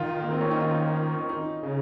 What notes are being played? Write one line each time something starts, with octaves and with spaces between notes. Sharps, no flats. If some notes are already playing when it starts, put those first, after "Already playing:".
Already playing: D#3 F4
A#3
C4
C#4
D#4
F4
D#4
C#3